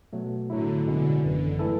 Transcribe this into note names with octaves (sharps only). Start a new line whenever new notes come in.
B2 F#3 A3
A2 D3 F#3 A3 E4
B1 B2 D3 G#3 C#4 E4
G#1 F#2 D3 E3
E3 A3 E4 A4